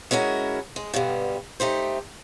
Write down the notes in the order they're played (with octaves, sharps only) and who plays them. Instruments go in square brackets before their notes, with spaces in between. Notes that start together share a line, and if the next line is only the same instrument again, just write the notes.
[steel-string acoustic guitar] G#3 C#4 E4 F#4 A#4
G#3
G2 B2 D3 G3
A3 D#4 G4 C5